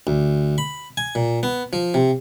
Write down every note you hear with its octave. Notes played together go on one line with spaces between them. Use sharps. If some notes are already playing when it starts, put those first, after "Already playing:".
D2
B5
G#5
A#2
B3
F3
C3